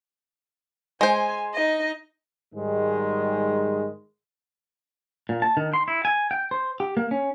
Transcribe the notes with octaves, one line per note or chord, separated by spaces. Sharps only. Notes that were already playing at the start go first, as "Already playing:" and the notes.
G#3 C5 G#5
D#4 D#5
G#2 D#3 G3 G#3
A#2
A5
D#3
C6
E4
G#5
G5
C5
G4
A#3
C#4